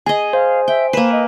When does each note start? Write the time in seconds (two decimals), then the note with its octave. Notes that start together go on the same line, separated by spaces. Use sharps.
0.06 G#4 D#5 G#5
0.33 C5 F5
0.68 E5 G5
0.93 A#3 B4 E7
1.12 D#5